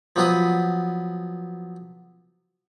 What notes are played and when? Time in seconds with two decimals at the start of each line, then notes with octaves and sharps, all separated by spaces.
0.16 F3 F#3 B3 F#4 B5 D#6